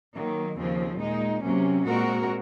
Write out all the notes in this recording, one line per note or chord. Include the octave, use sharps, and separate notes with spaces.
D#3 F#3 A#3
D#2 C#3 F3 C4
A#2 G#3 D#4
C3 F#3 A#3 C#4
A#2 G#3 C4 F#4 A#4